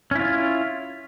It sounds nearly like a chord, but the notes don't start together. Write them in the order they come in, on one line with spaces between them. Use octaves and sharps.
C#4 E4 F4